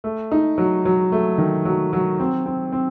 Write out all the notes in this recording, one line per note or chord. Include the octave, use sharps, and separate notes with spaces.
A3
D#4
F#3
F#3
A3
D#3
F#3
F#3
C4
C4
C4